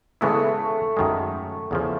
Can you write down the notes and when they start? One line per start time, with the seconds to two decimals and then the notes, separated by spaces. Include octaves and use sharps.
0.21 C#3 E3 G#3 A3 B3 E4
0.97 F#2 D#3 G#3
1.71 E2 C#3 F3